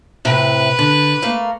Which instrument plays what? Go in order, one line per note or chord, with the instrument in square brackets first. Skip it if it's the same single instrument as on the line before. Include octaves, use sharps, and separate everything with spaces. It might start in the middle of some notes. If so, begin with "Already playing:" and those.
[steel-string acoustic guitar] A2 C3 [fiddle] B4
[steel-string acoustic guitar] D3
A3 A#3 A#4